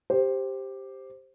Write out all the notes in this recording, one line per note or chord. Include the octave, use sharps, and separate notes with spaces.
G4 C5